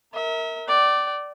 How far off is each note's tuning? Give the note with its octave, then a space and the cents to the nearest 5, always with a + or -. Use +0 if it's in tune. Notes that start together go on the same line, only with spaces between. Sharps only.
A#4 -10 E5 -35
D5 +0 G5 -45